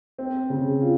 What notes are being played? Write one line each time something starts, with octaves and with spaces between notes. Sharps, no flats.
C4
C#3
F4